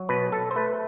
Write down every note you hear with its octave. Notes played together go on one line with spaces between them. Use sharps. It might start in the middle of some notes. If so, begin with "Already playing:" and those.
Already playing: F#3
B2 B4
B2 A4
C5
A3 B4